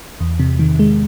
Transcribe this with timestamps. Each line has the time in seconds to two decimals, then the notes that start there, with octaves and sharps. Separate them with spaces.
0.20 E2
0.40 C3
0.59 D#3
0.79 G#3